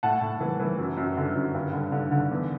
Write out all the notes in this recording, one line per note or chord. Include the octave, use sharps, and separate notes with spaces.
A2 F#5 A5
A2
E3
E3
F#2
F#2
D3
F#2
G2
D3
D3
D3
E2